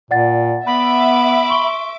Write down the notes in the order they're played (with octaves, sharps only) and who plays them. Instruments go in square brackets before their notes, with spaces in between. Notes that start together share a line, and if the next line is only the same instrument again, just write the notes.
[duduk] A#2 [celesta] D5 F#5 A6
[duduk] B3 [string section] E5 D6 [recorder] B5
[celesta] C6 C#6 G7